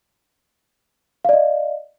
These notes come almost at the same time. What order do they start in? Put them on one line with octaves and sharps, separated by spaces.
F5 D5 D#5